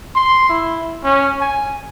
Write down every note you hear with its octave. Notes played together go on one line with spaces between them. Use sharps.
C6
E4
C#4
G#5